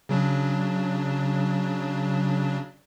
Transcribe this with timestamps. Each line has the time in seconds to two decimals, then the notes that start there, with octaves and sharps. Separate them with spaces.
0.09 C#3 F#3 D4